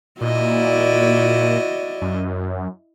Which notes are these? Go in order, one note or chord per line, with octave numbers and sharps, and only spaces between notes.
A#2 E4 F#4 D5 D#5
F#2